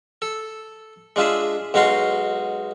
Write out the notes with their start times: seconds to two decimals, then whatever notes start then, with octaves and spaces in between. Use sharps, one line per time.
0.22 A4
1.16 G#3 D4 F4 G#4 E5
1.74 B1 G#3 D#4 F#4 F5 C6